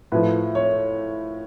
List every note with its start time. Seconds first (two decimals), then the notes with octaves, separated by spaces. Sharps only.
0.12 A2 F3 B4
0.55 C#5